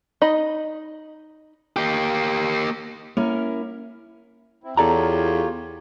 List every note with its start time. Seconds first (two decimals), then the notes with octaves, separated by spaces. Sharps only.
0.21 D#4 D#5 B5
1.76 A#3 G4
3.17 A#3 C#4 E4 A#4 C#5
4.64 C4 E4
4.77 E2 F4 G4 A4 C#5 D5 A#5